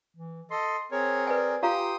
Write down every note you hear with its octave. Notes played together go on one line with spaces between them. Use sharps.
E3
A4 D#5 C6
C4 G#4 A#4 C#5
B4 D5 G#5
F4 G4 F5 G5 A#5 C6 D#6